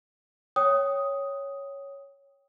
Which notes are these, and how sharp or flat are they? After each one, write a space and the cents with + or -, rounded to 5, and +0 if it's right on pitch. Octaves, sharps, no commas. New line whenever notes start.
C#5 +0 G5 +0 D#6 +5